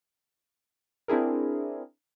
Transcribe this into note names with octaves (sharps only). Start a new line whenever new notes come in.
C4 D4 E4 G#4 A#4